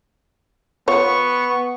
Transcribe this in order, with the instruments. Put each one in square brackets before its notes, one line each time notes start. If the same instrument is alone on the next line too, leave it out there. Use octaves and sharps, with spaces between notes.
[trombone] B3 [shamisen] F4 C#5 [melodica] C#6